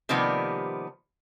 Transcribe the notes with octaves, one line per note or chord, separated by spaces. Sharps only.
C3 D#3 F3 G3 A#3 B3